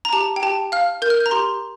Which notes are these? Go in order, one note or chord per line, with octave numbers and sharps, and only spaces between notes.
A#5
G4 A5
G5
G4 A5
F5 F6
A#4 G6
F6
G6
A#5
G4 C6